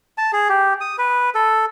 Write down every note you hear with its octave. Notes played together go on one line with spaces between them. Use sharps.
A5
G#4
G4
D#6
B4
A4